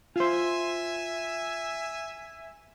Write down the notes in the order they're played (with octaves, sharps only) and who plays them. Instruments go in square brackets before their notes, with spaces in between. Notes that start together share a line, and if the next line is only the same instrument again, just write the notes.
[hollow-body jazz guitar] F4 C5 [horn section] E5 G#5